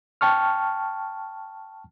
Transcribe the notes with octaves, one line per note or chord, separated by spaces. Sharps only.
G5 A5 C#6 F6